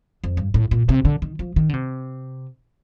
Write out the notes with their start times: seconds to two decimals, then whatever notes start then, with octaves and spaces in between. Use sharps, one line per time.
0.24 F2
0.37 G2
0.54 A2
0.71 A#2
0.89 C3
1.05 D3
1.22 D#3
1.39 F3
1.56 D#3
1.69 D3
1.74 C3